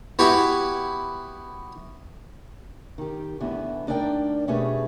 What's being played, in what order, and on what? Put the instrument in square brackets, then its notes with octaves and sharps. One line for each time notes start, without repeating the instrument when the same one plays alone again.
[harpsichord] B3 E4 F#4 G4 G#5
[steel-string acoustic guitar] D#3 G4
E2 A2 D3 E3 B3 E4
D2 D4 D#4 A#4 D5 G5
B2 A3 C#4 G4 G#4 B4